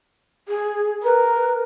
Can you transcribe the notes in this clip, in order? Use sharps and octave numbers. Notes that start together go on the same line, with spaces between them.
G#4
A#4 B4